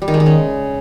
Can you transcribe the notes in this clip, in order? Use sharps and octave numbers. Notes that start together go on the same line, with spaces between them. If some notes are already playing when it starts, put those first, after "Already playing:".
G3
D#3
G#3
D#3
C#3